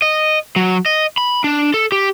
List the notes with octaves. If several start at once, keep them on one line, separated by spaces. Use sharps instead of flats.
D#5
F#3
D#5
B5
D4
A4
G4